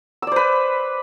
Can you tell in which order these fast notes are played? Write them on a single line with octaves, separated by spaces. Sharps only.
E6 D5 C5 B4